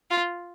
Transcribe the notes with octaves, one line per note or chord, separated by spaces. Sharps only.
F4